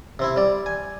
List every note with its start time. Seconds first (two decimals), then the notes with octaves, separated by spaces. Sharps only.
0.19 C3 C4 E4
0.36 G3 D5
0.66 G#5